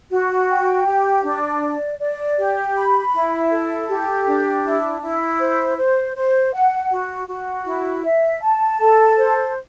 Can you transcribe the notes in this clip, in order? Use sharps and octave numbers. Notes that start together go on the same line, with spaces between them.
F#4
G5
G4
D4
D5
D5
G4
B5
E4
A4
G4
D4
E4
E4
C5
C5
C5
F#5
F#4
F#4
E4
E5
A5
A4
C5